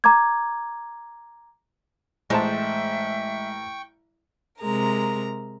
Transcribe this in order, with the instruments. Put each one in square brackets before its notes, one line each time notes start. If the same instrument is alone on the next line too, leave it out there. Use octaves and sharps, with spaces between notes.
[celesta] A#5 D6 G#6
[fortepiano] A1 C5 A5 [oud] G#3 [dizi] E5 [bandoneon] G5 C#6
[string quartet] C3 G#3 A#4 A#5